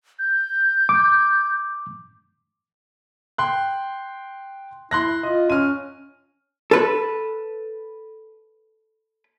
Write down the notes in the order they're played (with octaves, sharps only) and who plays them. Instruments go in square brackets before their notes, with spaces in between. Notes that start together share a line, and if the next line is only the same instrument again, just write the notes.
[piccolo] G6
[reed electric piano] D6
[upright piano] G5 C6 F#6
[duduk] E4 [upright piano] C6 F#6 A#6
[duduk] F4 [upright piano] D#5
[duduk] C#4 [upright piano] F6 D#7
[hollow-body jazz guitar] A4 B4